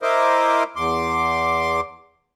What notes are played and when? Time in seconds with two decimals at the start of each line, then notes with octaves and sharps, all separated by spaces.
0.02 E4 A#4 C5 D#5 D6
0.76 E2 C6 D6